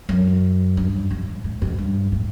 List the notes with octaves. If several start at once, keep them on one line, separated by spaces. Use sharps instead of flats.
F#2
G2
G#2
A2
G#2
G2
A2